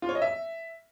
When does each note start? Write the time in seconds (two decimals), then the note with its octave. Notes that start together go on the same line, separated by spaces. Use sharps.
0.02 F4
0.09 C#5
0.15 D#5
0.22 E5